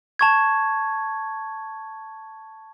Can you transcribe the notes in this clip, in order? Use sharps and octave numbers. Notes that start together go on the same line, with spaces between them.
A5 C#6 G#6